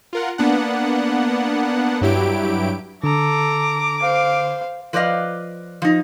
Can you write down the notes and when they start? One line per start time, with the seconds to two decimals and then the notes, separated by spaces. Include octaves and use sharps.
0.13 F4 A#4 F#5
0.38 A#3 B3 D4 F#5
2.01 G2 F#3 E4 G4 D7
3.04 D3 A4 A#5 D6
4.02 C5 F5
4.93 F3 B4 D5 D#5 F5
5.82 F3 D#4